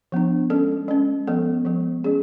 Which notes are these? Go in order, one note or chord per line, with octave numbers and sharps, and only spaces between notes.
F3 B3 D4
G#3 C#4 A4
G#3 C#4
F3 G#3 B3 A4
F3 G#3 B3
G#3 C#4 G#4